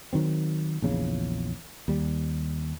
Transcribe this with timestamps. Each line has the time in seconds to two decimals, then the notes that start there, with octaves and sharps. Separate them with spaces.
0.13 D#3 F#3 C4
0.82 A#1 E2 C#3
1.88 D#2 G3